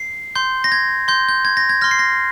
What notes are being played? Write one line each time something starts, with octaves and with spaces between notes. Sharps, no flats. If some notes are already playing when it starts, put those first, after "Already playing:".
Already playing: C7
C6 G6
A#6
G#6
C6 G6
G6
G#6
A#6
G#6
C6 F6 A#6
C7
A#6